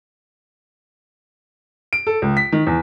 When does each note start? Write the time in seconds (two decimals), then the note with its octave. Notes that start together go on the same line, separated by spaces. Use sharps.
1.93 D7
2.07 A4
2.22 C#2
2.37 B6
2.53 D#3
2.67 E2